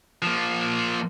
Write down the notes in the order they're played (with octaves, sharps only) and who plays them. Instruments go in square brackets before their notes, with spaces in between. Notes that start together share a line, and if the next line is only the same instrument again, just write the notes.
[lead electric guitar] F3 A#3